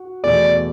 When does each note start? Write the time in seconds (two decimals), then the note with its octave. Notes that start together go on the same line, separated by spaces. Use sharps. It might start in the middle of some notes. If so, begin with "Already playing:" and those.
Already playing: F#4
0.23 E2 B2 A3 D5